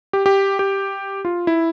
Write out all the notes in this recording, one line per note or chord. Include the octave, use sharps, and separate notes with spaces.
G4
G4
G4
F4
E4